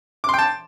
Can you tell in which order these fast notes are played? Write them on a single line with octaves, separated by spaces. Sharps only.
D6 C6 G5 A5